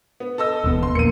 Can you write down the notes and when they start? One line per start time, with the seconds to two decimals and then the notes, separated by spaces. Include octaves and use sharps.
0.20 B3
0.38 A4 D#5 E6
0.64 E1 D#2 B3
0.83 C6
0.95 A#1 A#3 C#7 D#7